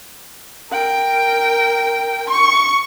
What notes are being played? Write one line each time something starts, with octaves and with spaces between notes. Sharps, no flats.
A#4 G5
C#6